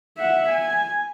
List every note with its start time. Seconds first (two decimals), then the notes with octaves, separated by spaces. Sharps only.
0.17 E5 F#5
0.49 G#5